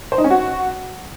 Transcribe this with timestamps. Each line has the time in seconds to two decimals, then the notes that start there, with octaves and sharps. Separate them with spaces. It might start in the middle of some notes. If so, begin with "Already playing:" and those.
0.12 C5
0.18 D#4
0.24 C#4
0.31 F#4